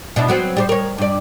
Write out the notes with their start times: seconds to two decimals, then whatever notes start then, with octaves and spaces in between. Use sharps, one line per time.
0.16 B2 D4 E4
0.28 F#3 B3 C4
0.57 G3 G4 C5
0.69 A#4 C#5
0.98 G2 D5